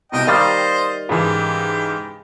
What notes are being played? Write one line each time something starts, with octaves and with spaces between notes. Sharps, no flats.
C2 B2 D#5 G5
D#3 G3 C5 D#5 F5 A6
G#2 C#3 E3 G4